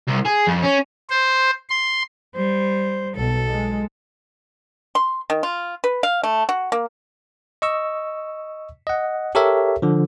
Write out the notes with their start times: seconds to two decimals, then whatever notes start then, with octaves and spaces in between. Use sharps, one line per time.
0.07 C2
0.25 G#4
0.47 F2
0.63 C#4
1.10 C5
1.70 C6
2.36 G3 C5
3.16 B1 B2 A4
3.52 G#3
4.95 C6
5.30 D#3
5.43 F4
5.84 B4
6.03 F5
6.23 A3
6.49 F#4
6.72 A#3
7.62 D#5 C#6 E6
8.87 D#5 F#5
9.35 G4 A4 A#4 C#5 E5
9.82 D3 F3